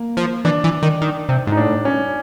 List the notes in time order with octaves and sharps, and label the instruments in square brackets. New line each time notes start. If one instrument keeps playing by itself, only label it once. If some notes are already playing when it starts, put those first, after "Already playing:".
Already playing: [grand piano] A#3
[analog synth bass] F3
[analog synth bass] E3 [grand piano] D4
[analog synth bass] E3
D#3
D#3
C3
G#2
[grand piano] D#4
[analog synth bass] A2 [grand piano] D4
[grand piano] C#4